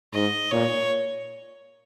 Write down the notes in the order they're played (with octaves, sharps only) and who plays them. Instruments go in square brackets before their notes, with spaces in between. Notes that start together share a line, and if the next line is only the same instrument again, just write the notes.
[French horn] G#2 [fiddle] D#5
[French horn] A#2 [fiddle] C#5